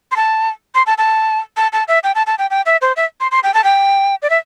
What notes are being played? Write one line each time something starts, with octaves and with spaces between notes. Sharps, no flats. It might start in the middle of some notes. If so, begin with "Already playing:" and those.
C6
A5
C6
A5
A5
A5
A5
E5
G5
A5
A5
G5
G5
E5
C5
E5
C6
C6
G5
A5
G5
D5
E5